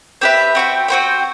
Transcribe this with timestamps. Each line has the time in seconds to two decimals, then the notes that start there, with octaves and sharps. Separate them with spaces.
0.21 C4 G4 B4 E5
0.55 C4 F#4 C5 G5
0.88 C4 F#4 C5 G5